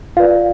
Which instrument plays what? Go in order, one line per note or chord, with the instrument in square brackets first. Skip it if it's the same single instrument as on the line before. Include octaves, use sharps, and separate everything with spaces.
[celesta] F4 B4 D5 F5